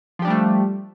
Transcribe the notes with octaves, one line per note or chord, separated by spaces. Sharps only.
F3 G3 A3 D4 G4